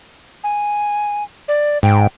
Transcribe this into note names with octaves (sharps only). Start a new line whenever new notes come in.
G#5
D5
G#2 G5